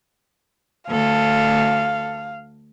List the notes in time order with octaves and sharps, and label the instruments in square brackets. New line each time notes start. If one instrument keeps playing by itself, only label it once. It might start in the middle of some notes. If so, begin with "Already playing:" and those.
[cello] D2 A4 [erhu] F5